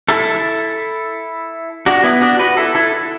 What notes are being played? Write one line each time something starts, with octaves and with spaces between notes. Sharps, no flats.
E4 A4
D4 F#4
B3 E4
D4 F#4
F#4 B4
E4 A4
E4 A4